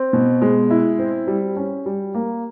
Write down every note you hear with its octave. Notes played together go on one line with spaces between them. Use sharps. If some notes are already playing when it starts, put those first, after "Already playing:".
Already playing: C4
B2
G#3
E4
C4
G3
C#4
G3
A#3